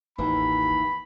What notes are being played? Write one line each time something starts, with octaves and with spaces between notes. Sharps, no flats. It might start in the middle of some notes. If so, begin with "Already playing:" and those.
A1 D#2 E3 B5